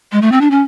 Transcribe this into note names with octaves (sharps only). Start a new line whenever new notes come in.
G#3
A3
C4
D4
C#4